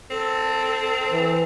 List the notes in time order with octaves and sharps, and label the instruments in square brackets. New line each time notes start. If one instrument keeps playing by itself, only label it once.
[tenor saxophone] C4 [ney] A4
[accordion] E3